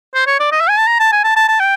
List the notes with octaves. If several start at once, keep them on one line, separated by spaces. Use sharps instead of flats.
C5
C#5
D5
D#5
E5
G#5
A5
A#5
A5
G#5
A5
A5
A5
G5